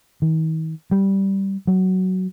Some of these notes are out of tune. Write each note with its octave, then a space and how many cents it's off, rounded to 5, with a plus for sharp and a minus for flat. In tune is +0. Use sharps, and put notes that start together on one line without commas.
D#3 +45
G3 -10
F#3 +10